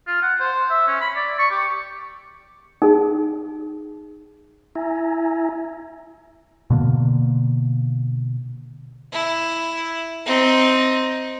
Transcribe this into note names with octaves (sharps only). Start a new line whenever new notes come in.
F4
F#5
C5
E5
C#4
B5
D5
C#6
G4
D#4 G#4
E4 E5 G#5 A#5
B2 D3 A#3
E4
C4 D#4